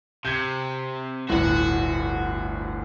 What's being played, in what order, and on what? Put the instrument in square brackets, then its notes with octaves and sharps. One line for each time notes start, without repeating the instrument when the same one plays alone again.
[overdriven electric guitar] C3 [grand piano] G6 G#6
[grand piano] G1 D2 A2 [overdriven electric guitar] F#4 F#5